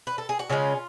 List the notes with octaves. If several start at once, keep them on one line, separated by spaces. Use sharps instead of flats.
B4
A4
G#4
F#4
C#3 G#3 C#4 F4